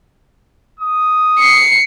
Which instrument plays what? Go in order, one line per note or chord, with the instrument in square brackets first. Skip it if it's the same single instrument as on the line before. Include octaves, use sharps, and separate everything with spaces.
[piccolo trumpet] D#6
[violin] C7 C#7